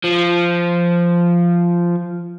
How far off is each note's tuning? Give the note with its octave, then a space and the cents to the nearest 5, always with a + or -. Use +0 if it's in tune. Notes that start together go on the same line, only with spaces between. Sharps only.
F3 -10